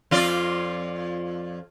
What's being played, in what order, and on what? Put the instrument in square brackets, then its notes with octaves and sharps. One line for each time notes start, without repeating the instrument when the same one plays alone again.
[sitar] F2 F4 D5